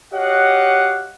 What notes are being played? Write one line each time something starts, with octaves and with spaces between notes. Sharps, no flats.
F#4 G4 C#5 D#5 F5 F#5